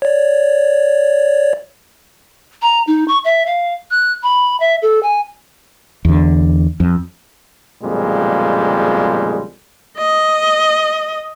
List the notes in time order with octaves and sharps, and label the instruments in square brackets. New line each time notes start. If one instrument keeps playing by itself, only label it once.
[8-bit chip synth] C#5 D5
[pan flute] A#5
D#4
C#6
E5
F5
F#6
B5
E5
A4
G#5
[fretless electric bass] E2 D3
F2
[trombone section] B1 F2 A#2 C#3 G3 G#3
[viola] D#5